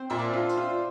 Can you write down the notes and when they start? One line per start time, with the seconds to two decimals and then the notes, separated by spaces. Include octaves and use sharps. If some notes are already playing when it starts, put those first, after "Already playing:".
Already playing: C4 C5
0.10 A#2 E5
0.18 D4 D5
0.34 F4
0.49 C5 C6
0.58 F4